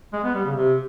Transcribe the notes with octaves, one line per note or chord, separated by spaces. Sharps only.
G#3
B3
G3
C#3
C3